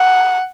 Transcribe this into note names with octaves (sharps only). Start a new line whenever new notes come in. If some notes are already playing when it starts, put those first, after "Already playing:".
Already playing: F#5